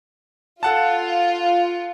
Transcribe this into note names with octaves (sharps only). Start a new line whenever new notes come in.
F4 A4 F#5 A5